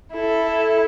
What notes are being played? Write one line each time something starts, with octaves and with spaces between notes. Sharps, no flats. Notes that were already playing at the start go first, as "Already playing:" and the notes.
E4 A4